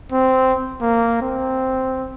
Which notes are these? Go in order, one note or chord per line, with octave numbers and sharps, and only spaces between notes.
C4
A#3
C4